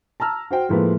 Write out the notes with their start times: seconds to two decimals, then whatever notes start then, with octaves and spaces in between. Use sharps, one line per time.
0.20 A5 A#5 E6 F6
0.51 F#4 C5 G5
0.69 A2 F3 G#3 A#3 A4 B4